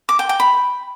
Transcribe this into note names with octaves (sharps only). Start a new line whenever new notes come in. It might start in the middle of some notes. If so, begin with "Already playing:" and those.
D6
G5
G5
B5